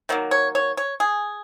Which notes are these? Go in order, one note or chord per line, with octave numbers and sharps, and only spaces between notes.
D#3 F#3 A#3
C#5
C#5
C#5
G#4